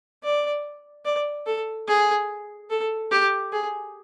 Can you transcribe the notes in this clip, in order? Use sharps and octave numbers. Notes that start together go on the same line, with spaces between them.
D5
D5
A4
G#4
A4
G4
G#4